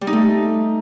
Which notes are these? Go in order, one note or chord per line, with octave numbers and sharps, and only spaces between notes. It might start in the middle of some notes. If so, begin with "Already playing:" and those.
G3
D#4
A3